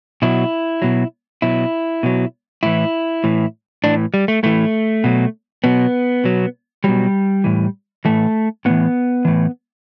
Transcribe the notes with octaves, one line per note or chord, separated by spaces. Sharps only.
B2 F#3 E4
B2 F#3
B2 F#3 E4
B2 F#3
A2 E3 E4
A2 E3
A2 E3 D4
G3
A3
A2 E3 A3
B2 F#3
B2 F#3 B3
B2 F#3
B2 F#3 G3
A2 E3
A2 E3 A3
A2 E3 B3
A2 E3